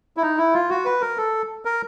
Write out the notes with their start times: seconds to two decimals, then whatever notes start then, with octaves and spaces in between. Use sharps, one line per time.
0.17 E4
0.22 D#4
0.38 E4
0.54 F4
0.70 F#4
0.85 B4
1.01 A#4
1.17 A4
1.65 A#4